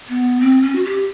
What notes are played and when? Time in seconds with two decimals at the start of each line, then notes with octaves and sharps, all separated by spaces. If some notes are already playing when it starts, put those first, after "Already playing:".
0.09 B3
0.41 C4
0.62 C#4
0.75 F#4
0.85 G4